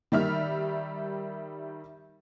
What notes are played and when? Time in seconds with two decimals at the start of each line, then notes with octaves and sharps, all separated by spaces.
0.12 D#3 G3 E5 F6